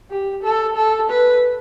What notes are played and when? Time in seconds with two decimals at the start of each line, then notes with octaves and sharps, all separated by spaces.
0.10 G4
0.43 A4
0.76 A4
1.10 B4